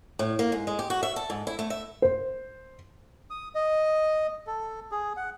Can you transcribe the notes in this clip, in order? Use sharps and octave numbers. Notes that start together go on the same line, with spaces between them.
A2
A#3
G#2
G#3
G4
F#4
E5
A4
G#2
E4
A3
E5
C5
D#6
D#5
A4
G#4
F#5